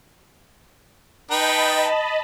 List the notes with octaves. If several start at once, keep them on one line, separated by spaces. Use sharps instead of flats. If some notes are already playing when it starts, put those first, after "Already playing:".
D#4 B4 D#5 G5 A5 B5